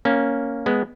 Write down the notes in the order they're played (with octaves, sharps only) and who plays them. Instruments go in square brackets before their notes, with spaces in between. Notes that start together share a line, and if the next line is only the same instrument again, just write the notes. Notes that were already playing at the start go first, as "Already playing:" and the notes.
[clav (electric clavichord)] A#3 C#4
G#3 B3